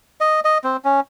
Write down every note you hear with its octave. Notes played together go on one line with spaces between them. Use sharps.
D#5
D#5
C4
C#4